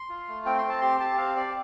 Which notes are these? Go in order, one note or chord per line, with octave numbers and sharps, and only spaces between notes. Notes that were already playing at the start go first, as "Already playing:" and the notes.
Already playing: C6
F4
A3
C4 G5
C6
C4
A5
G4 C6
G4 A5
C4 F5
G4 D5